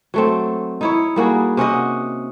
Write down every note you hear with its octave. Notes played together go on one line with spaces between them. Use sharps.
F#3 A3 C4
D#4 E4 C#5
G3 A#3 F#4 G#4
C3 C#4 F#4 D#5